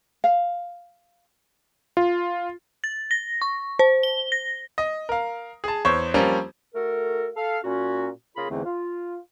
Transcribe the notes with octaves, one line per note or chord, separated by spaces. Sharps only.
F5
F4
A6
A#6
C#6
C5
G7
A#6
D#5
A#4 F5
G#4 A5
E2 C5 C#5 C#6
F3 G3 A#3 C4 C#4
A3 F#4 A4 A#4
A4 F5
A#2 C#4 F#4
C#3 A#3 F4 G#4 A#4 B5
E2 G#2 D3 E3 A3 C4
F4